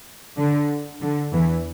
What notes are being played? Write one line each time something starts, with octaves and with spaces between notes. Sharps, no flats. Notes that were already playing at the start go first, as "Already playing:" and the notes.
D3
D3
E2 E3